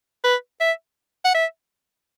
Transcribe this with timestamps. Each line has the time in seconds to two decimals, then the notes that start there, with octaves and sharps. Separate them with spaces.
0.24 B4
0.61 E5
1.25 F#5
1.34 E5